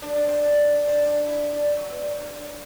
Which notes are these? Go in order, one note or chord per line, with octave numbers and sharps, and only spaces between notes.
D4
D4
C4
D4
D4
C4
D4
E4
D4
G3
F#3
B2
A2
G2
A2